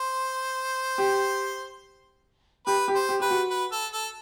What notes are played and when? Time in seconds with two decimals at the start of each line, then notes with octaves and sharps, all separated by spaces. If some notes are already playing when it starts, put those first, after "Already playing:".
Already playing: C5
0.98 G4
2.67 G4 B4
2.88 G4
2.95 C5
3.09 G4
3.20 G4 B4
3.30 F#4
3.50 B4
3.72 A4
3.93 A4